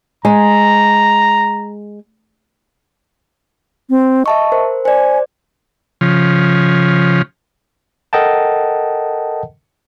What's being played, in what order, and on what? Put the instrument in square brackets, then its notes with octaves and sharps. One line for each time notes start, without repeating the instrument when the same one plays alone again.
[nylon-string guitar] G#3 [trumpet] A#5
[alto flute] C4
[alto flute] D#5 [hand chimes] E5 A5 C#6
[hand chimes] A#4 C5
[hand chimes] C5 D5 [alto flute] G#5
[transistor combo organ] C#3 F3
[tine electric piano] A4 A#4 D#5 F#5 G5 A5